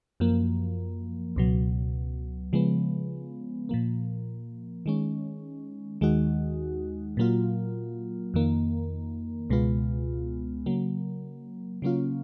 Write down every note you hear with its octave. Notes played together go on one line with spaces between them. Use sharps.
F#2 F3 A#3
C#2 B2 F#3
C#3 F3 G#3 B3
A#2 F3 A#3
D#3 G#3 C#4
D#2 D#3 G#3 D#4 F#4
A#2 F#3 A#3 F4
F2 D#3 A#3
C#2 B2 G#3 B3 F4
C#3 F#3 A#3
C#3 F#3 A#3 C#4 F4